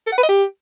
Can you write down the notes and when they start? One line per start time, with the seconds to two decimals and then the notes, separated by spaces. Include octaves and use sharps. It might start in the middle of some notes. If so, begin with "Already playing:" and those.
0.07 A4
0.12 F#5
0.18 B4
0.23 D#5
0.29 G4